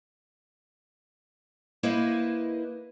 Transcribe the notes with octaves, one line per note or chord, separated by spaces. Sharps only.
A#3 E4 B4 C5 D#5